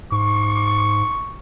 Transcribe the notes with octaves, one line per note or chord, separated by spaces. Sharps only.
G#2 C#6